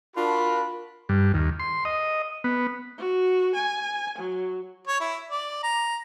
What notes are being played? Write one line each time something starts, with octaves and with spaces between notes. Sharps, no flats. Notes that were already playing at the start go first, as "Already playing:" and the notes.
D4 F4 F#4 A#4 B5
G2
D#2
C6
D#5
B3
F#4
G#5
F#3
C#5
E4
D5
A#5